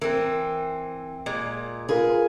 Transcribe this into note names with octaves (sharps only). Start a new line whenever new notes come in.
E3 C4 A#4
A#2 G#3
F4 G#4 A#4 B4